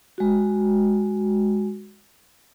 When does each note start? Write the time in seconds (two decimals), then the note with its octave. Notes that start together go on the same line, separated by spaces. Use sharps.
0.18 G#3 F#4